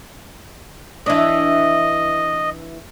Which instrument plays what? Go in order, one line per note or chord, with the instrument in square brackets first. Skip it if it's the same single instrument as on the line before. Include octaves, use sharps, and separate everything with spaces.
[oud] E3 D4 [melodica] D#5